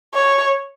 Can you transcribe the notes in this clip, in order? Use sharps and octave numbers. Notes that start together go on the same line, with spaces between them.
C#5